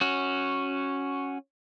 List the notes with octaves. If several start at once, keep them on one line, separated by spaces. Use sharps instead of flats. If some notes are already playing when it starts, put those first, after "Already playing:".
C#4 F#4